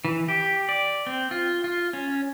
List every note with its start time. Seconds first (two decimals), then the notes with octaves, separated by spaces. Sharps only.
0.05 E3
0.28 G4
0.69 D5
1.07 C4
1.31 F4
1.64 F4
1.93 C#4